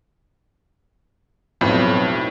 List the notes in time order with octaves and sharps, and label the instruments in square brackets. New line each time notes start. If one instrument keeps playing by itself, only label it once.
[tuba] B1 [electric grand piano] F2 [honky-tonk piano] A2